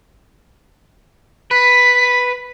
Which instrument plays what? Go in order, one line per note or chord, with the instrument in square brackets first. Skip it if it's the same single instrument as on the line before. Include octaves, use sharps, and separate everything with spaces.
[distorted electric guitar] B4 [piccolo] B6